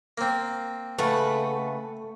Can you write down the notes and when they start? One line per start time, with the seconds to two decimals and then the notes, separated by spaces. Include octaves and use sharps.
0.18 A#3 C4
0.98 C#3 A3 B4 F#5